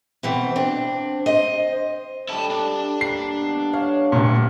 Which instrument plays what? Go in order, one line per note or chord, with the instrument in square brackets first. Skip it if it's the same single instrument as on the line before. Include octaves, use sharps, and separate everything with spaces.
[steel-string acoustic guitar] B2 E3 C4
C4 D4
C5 D#5
[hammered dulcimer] D3 G3 [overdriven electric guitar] E4 A5
[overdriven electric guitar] D4
[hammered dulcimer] A#3 A5 [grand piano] C7
[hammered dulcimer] B2
[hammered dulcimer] C#5 [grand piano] F5
[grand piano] D1 A#2